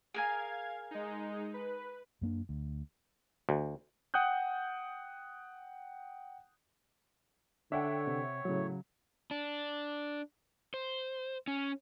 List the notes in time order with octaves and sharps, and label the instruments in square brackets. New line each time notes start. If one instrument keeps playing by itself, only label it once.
[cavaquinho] G#4 A#4 G#5 [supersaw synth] F5 G#6
[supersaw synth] G#3 D#4
B4
[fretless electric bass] F#2 A#3 D4
D2
[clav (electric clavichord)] D2
[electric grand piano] F#5 G5 D#6 F#6 G6
[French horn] D3 [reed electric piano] D4 [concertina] C#5 [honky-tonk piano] E5 F#5 G5
[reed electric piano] C3
[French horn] A2 [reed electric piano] C#3 F#3
[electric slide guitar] D4
C5
C#4